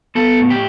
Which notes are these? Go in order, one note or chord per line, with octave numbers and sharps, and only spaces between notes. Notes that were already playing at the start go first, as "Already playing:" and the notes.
B3 A4
A2
G4